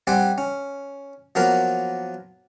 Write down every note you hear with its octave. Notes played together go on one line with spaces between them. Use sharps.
G3 C4 D5 F#5 G#5
C#4
F3 F#3 A#3 B3 A#4